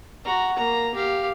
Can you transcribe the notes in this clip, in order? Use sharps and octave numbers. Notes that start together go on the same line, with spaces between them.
F#4 A#5
A#3 A#5
G4 F5